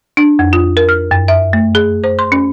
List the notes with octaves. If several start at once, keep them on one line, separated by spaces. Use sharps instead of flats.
D4
F2
F4
A#4
F6
F#2
E5
A3
G#4
C5
C6
C#4